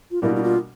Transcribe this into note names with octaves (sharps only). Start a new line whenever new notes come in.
F4
B2 G3 A#3 D4 E4 F#4
E4
F4